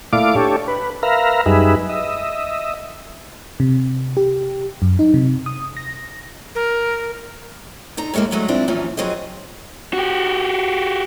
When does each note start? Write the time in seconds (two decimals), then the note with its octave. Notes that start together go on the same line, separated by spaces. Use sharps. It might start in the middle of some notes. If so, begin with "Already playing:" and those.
0.13 A#2 A3 E4 D5 F5 D6
0.36 D4 G4 A4 C#5
0.68 B4
1.03 A#4 B4 E5 F5 A#5
1.46 F#2 G3 D#4 G#4 B4 E5
1.89 D#5 E5
3.60 C3
4.17 G4
4.82 F#2
4.99 D#4
5.14 C3
5.46 D#6
5.77 A#6
6.55 A#4
7.97 D3 D#4 A#5
8.14 A2 C3 F#3 G#3 A#3
8.31 B2 D3 F#3 G#3 A3
8.48 A#2 C4 D4 E4
8.68 F#2 A#2 E3 F3 C#4
8.97 F2 F#3 C4 G#4 D#5
9.93 F#4 G4